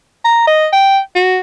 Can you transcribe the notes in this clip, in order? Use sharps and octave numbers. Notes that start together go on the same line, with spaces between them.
A#5
D#5
G5
F#4